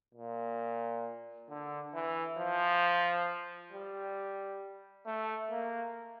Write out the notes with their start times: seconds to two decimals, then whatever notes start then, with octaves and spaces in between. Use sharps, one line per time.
0.15 A#2
1.49 D3
1.94 E3
2.38 F3
3.73 G3
5.06 A3
5.51 A#3